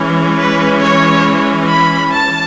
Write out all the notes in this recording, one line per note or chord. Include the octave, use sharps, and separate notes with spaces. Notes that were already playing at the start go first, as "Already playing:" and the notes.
Already playing: E3 G#3 C#4
B4
C#5
B5
A5